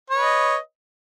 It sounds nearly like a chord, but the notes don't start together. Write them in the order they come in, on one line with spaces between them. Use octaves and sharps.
C#5 B4 D#5